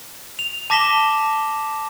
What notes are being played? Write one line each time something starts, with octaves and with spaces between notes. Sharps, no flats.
F7
A5 D6 A#6 B6 E7 G7